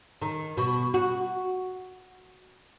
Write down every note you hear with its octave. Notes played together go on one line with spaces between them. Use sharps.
D#3
B2
F#4